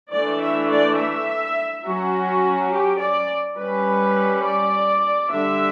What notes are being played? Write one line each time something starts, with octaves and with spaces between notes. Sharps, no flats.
E3 A3 D4 D5
E5
D5
E5
F#3 C#4 F#4
G4
D5
G3 C#4 B4
D5
D3 G3 D4 E5